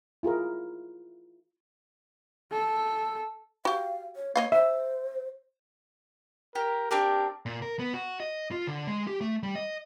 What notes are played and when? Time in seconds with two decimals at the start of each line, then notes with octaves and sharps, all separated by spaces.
0.23 E4 F4 G#4 A#4
2.52 A4
3.65 F#4 G4 F5
4.16 C#5
4.36 A#3 C#5 D#5 F5
4.52 C5 E5
6.55 G4 A#4
6.91 C4 D4 G4 A#4
7.46 A#2
7.62 A#4
7.79 B3
7.94 F#4
8.20 D#5
8.51 F4
8.67 D3
8.87 G#3
9.07 G4
9.21 A3
9.43 G3
9.55 D#5